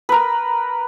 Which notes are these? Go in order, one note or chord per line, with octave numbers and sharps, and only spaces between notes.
A#4 B4